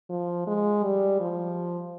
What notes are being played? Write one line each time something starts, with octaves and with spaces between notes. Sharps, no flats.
F3
G#3
G3
F3